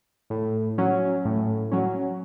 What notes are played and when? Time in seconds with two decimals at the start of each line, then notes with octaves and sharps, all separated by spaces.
0.30 A2
0.78 F#3 C#4
1.25 A2
1.71 F#3 C#4